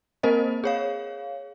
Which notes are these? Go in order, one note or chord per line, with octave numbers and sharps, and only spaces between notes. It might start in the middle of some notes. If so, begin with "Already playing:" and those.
A#3 C4 A#4 C5 D#5
G#4 C#5 F5